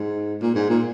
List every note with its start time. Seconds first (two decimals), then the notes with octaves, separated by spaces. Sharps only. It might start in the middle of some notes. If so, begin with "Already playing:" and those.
Already playing: G#2
0.42 A#2
0.55 G#2
0.69 A#2